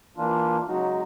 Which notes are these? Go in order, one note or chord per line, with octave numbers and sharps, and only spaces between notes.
E3 A#3 D4 F4
C#3 F#3 G#3 D#4 F#4